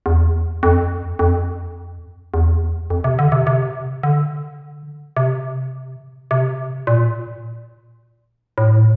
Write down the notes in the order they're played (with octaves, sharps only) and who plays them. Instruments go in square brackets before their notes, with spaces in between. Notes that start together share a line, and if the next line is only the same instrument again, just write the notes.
[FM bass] E2
F2
F2
E2
F2
C3
D3
C3
C3
D3
C3
C3
A#2
A2